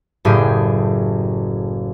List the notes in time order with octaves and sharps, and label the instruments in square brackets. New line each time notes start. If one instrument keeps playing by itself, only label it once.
[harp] F#1 A2 G4 G#4